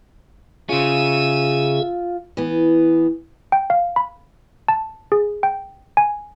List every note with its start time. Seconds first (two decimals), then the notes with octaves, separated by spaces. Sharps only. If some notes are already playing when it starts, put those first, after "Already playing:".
0.69 C#3 C#4 F4 G#4 E5 E6 D#7
2.37 E3 B3
3.52 G5
3.70 F5
3.96 B5
4.68 A5
5.12 G#4
5.43 G5
5.97 G#5